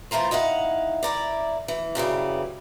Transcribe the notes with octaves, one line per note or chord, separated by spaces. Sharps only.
E3 A3 F4 A#4 C5
D#4 E4 F5 F#5
E4 A#4 D5
E3
F#2 C#3 E3 G3